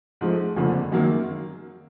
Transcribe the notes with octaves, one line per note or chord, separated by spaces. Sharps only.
G#2 F3 A3
F#1 F2 D3 F3
F#2 D#3 F#3 A#3